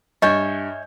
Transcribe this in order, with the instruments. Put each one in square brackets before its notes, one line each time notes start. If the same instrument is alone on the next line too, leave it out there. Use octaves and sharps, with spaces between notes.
[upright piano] G2 G6 [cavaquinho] C#5 E5 G#5 [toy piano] D#5